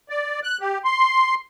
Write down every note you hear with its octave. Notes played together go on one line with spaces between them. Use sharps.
D5
F#6
G4
C6